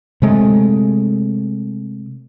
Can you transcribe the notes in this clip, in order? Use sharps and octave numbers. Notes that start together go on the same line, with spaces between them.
C3 G#3 A3